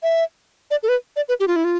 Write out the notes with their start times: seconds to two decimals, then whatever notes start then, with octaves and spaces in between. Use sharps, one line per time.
0.03 E5
0.71 D5
0.83 A4
0.89 B4
1.16 D5
1.29 B4
1.40 G4
1.48 F4
1.56 E4
1.65 F4